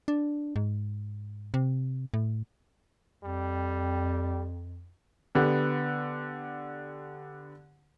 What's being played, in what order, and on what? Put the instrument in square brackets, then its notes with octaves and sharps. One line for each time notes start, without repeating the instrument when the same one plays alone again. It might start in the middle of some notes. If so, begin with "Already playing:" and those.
[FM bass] D4
G#2
C3
A2
[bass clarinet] F2 [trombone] G3
[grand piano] D3 B3 G4